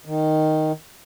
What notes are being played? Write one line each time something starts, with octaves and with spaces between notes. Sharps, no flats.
D#3